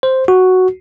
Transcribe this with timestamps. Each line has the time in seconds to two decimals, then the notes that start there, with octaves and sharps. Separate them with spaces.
0.03 C5
0.28 F#4